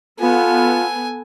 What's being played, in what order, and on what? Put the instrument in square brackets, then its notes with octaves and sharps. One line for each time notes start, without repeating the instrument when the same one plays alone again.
[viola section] B3 A4 [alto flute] F4 [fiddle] G#5